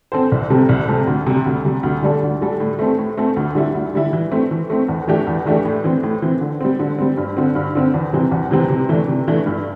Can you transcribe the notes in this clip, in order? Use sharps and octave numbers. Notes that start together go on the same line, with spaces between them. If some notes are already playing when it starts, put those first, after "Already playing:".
C4 A4 C5
C2
C3 G3 C4 A4
C2
C3 G3 C4 A4
D2
C3 G3
D2
C3 G3
D2
D3 G3 D4 A4
D2
D3 G3 D4 A4
A2
A3 C4 A4
A2
A3 C4 A4
D2
D3 G3 E4
D2
D3 G3 E4
E3
A3 C4
E3
A3 C4
E2
E3 A3 D4 G4
E2
E3 A3 D4 G4
A2
E3 C4
A2
E3 C4
D3
G3 C4
D3
G3 C4
G2
D3 C4
G2
D3 C4
E2
C3 E3 G3 C4
E2
C3 E3 G3 C4
C3
E3 A3 D4
C3
E3 A3 D4
G2